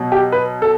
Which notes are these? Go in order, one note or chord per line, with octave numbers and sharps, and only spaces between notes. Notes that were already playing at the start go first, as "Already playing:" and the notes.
Already playing: B2 F#3
G4
B4
A4